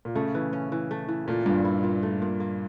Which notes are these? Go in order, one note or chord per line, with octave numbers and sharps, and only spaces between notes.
A#2
C#3 A3
E3
C#4
E3
A3
E3
A#2 A3
G2 A#2
E4
A#2
A3
A#2
A#3